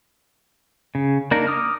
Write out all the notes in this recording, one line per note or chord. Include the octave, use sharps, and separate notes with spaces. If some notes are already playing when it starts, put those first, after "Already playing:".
C#3
A#3 D4 D#4 A#4
D6 D#6 F6